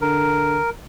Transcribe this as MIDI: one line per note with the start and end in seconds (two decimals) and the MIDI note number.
0.01 0.58 50
0.01 0.70 70